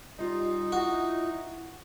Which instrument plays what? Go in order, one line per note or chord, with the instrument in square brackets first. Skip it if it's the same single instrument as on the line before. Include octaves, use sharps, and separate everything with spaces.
[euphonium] G3 [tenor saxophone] D#4 [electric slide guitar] F4 D#5
[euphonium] E4 [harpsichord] F#4